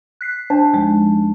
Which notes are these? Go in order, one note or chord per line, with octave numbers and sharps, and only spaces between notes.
F#6 B6 C7
D4 C5 A5
D#2 F3 G#3